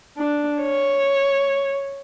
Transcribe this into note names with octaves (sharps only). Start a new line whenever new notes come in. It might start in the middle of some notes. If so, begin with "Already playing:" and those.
D4
C#5